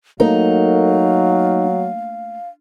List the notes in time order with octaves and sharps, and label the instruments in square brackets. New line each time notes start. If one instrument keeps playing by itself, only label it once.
[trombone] F#3 [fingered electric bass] A3 A#3 [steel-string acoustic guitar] D#4 [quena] F5